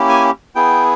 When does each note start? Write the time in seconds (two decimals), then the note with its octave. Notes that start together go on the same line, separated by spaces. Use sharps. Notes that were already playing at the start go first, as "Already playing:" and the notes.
Already playing: A#3 C#4 E4 G4
0.09 G#5
0.56 B3 E4 G#4 G5